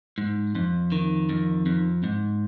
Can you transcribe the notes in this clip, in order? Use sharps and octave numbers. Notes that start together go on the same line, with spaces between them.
G#2
F2
D#3
F2
F2
G#2